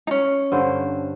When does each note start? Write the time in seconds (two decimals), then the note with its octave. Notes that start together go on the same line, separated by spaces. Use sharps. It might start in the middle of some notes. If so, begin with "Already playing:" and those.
0.07 C#4 D#4
0.52 G2 D3 C5